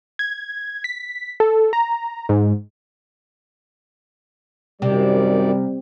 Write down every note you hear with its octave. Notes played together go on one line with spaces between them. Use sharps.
G#6
B6
A4
A#5
G#2
F#2 C3 D#3 G3 D5